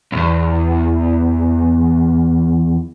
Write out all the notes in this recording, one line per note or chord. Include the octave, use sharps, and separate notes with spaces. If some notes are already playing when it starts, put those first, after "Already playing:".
B1 E2